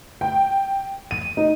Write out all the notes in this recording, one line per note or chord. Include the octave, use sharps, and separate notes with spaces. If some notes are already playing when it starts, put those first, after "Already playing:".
G5
D#7
D#4